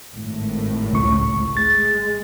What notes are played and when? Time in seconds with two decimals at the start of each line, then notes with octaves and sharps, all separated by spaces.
0.14 G#1 A2
0.93 C#2 C#6
1.57 G#3 A6